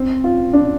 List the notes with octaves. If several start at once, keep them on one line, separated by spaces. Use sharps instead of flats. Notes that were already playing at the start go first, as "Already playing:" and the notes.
Already playing: C4
F4
D4